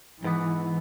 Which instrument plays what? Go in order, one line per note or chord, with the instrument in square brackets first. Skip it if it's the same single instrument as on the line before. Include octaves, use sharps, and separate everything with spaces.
[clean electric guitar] G#2 B3 [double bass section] E3